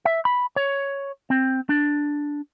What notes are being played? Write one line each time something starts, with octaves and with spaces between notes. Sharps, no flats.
E5
B5
C#5
C4
D4